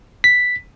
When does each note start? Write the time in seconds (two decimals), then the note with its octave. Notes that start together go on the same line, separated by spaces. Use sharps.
0.24 B6